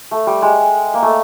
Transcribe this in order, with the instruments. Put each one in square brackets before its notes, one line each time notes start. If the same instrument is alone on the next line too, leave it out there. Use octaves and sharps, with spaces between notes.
[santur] A3
G3
G#3
A#3
A3